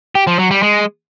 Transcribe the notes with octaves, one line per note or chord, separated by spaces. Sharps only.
G4
F3
F#3
G3
G#3